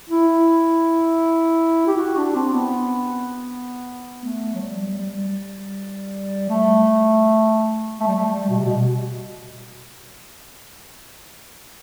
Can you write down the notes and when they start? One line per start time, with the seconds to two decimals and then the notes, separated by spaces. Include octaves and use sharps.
0.10 E4
1.87 G4
1.97 F#4
2.17 D4
2.35 C4
2.54 B3
4.24 A3
4.54 F#3
4.61 G3
4.99 G3
6.50 A3
8.00 A3
8.07 G3
8.16 A3
8.25 G3
8.50 B2
8.58 C3
8.65 B2